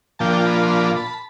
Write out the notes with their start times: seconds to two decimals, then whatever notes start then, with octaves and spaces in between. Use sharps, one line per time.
0.19 A#2 F3 A#3 D4 F4 G5 A5
0.45 A5 B5
0.63 C6
0.70 A5 B5
0.96 A5 B5